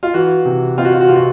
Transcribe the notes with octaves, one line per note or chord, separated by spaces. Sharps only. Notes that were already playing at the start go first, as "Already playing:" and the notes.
F4
E3 F#4
C3
C4 F4
F#4
F4
F#4
C3 F4
F#4